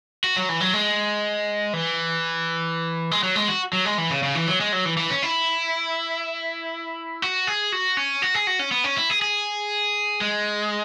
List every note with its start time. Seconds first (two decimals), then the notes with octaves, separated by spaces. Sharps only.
0.24 F#4
0.36 F#3
0.49 E3
0.61 F#3
0.73 G#3
1.73 E3
3.11 G#3
3.23 F#3
3.35 G#3
3.48 F#4
3.73 F#3
3.85 G#3
3.98 E3
4.11 C#3
4.23 C#3
4.35 E3
4.48 F#3
4.60 G#3
4.73 F#3
4.85 E3
4.97 E3
5.10 C#4
5.23 E4
7.22 F#4
7.47 G#4
7.72 F#4
7.97 C#4
8.22 F#4
8.35 G#4
8.47 F#4
8.59 C#4
8.72 B3
8.84 C#4
8.97 E4
9.10 G#4
9.22 G#4
10.21 G#3